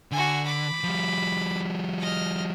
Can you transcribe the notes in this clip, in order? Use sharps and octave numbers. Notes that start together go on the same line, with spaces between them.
D3 F#4 G#5
B5 D6
F3 G3
D#5 F6